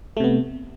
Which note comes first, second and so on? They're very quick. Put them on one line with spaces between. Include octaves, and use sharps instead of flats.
A3 C3 B3